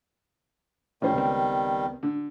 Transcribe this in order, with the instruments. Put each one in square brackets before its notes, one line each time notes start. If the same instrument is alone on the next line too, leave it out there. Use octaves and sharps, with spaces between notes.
[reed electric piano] A2 F3 [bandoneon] D#3 G3 [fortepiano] C#4 C5
[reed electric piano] C#2 B3 C4
[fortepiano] D3